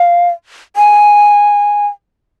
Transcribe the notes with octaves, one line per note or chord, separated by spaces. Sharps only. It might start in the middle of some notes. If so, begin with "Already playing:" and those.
Already playing: F5
G#5